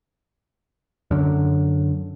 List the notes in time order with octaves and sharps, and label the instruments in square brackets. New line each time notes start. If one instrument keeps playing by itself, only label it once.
[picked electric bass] F#2 D3